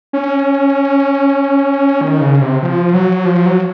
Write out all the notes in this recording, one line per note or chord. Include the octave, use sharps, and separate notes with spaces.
C#4
D#3
C#3
C3
F3
F#3
F3
F#3